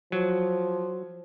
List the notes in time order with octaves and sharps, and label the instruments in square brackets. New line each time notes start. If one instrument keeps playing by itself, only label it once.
[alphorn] F3 [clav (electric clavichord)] F#3